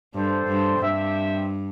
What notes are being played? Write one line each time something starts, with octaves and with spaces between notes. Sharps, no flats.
G2 D4 A4 C5
G2
G2 C4 G4 E5